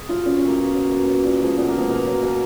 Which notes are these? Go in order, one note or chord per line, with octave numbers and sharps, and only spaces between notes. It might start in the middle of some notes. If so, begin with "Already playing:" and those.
Already playing: G#4
F#3 F4
A#2 C#4
C#4
F#3
A#3
B2
F#3
B2 A#3
F#3
A#2
F3 G#3
A#2 B3
A#3
F3 G#3 B3
B2 A#3
F#3
B2